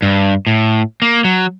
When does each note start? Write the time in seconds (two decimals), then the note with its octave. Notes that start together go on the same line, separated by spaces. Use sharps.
0.02 G2
0.47 A2
1.02 A#3
1.24 F#3